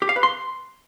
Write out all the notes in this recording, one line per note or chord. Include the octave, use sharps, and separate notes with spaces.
G4
F5
B4
C6